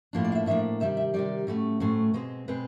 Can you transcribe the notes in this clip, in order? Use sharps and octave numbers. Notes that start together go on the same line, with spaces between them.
A2 F3 A#3 D4
D5
F5
E5
A2 F3 A#3 D4 E5
C3 D#3 G3 E5
E5
C3 D#3 G3 D5
A2 F#3 A3 C#4
A2 F#3 A3 C#4 C5
B2 G#3 C4
B2 G#3 C4 B4